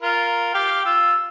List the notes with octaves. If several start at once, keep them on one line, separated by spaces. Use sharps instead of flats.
F4 A#4
G4 F5 G5
F4 E6